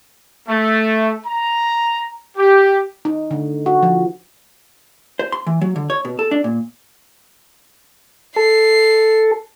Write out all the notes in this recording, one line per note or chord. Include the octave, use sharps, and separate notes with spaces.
A3
A#5
G4
D#4
D3
F#4
F3
C5
C6
E3
F#3
D3
C#5
B2
A4
D4
A#2
A4 C7